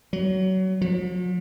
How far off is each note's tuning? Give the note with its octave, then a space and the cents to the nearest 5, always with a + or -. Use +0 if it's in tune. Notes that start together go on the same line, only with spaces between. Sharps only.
F#3 +25
F#3 -45